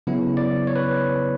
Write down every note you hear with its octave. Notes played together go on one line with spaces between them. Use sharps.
C#3 F#3 B3 E4
D5
C#5
B4